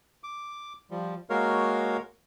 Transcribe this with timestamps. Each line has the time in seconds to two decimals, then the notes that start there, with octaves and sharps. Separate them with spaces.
0.23 D6
0.91 F3 G3
1.30 G#3 A#3 F#4 A#4 C#5 F5